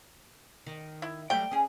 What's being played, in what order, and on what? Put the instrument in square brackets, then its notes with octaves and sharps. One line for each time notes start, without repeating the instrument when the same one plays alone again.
[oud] D#3
[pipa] E4
[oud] F#3 G3 A3 [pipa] G5
[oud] C#4 G#4